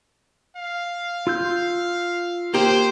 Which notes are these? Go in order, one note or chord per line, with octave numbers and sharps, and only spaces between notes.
F5
F4 E6 G6
A#3 G4 C5